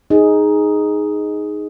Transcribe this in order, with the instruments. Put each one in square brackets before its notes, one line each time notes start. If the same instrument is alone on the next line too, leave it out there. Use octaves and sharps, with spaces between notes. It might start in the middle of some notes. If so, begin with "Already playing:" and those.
[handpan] D#4 G#4